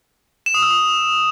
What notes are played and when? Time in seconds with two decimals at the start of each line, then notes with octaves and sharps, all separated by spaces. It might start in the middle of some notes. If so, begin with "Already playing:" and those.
0.46 E7
0.54 D#6
0.63 E6
0.71 D#6